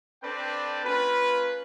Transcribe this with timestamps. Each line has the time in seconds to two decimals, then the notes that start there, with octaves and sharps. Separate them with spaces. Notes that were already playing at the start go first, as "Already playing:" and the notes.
0.23 C4 D4 A4 B4 D5 G5
0.84 A#3 C#4 F4 B4